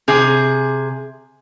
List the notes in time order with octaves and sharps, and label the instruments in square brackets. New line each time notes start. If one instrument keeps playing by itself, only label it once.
[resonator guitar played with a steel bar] C3 G#4